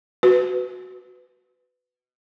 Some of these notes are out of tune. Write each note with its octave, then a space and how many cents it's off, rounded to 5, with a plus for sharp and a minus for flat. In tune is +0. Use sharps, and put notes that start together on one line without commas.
F#4 +0 B4 +20